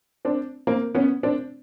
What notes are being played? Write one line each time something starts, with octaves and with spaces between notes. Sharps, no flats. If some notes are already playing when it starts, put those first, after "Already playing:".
C4 D4
A#3 C4
B3 C#4
C4 D4